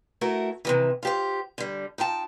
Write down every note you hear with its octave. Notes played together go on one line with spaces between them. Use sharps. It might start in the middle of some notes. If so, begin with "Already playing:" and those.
A3 E4 F#4 A#4
C3 D#3 E3
F4 G4 C5
D3 G3
D#4 F4 G5 A5